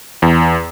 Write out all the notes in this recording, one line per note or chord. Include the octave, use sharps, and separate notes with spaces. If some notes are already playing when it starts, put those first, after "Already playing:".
E2